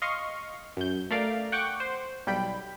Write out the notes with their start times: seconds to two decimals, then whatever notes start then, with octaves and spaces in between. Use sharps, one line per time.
0.02 D#5 F5 C6 C#6
0.77 F#2 G6
1.11 A3 A#4 D5 F5
1.52 F#5 G5 C#6 D6 F#6
1.80 C5
2.27 B1 G3 G5 B5